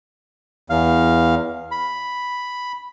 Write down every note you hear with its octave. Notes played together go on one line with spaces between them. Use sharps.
E2 F5
B5